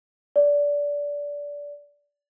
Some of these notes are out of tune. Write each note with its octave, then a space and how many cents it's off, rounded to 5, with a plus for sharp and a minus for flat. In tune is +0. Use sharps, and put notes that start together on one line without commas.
D5 -20